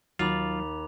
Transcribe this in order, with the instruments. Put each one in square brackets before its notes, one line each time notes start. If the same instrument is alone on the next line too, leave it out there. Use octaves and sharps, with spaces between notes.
[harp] D#2 A6 [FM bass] F#3 [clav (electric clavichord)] F4 [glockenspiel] B5 D6 F7